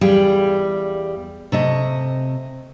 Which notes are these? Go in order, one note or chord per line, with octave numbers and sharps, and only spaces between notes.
E2 G3 G#4 F5 G5
C3 A3 D#5